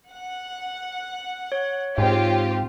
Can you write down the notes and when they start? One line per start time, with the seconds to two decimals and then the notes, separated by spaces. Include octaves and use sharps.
0.10 F#5
1.52 C#5
1.98 G#2 C4 F4 G4